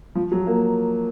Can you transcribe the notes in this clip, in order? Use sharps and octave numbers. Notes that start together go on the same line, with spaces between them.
F3
F#3
A#3